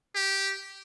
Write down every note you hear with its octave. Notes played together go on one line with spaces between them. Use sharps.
G4